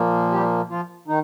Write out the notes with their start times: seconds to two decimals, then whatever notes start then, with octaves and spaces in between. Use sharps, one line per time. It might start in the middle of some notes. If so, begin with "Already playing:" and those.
Already playing: A#2 F3 A#3
0.31 G3 G4
0.69 F3 F4
1.08 D#3 D#4